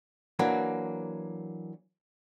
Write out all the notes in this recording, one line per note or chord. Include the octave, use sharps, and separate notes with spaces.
E3 F#3 A#3 D4